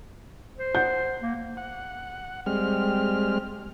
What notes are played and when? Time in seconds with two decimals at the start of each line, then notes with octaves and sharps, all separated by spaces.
0.58 C5
0.75 F#5 G6
1.21 A#3
1.57 F#5
2.46 G3 G#3 C4 F6